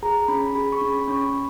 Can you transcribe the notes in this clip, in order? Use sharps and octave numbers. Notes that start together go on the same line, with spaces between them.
G#4 A#5
C#4 B5
G#4 B5
C#6
C#4
B5
C#4 C#6
B5